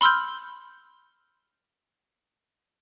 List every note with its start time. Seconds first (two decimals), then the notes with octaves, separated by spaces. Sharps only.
0.01 B5 C6 E6 F6 G6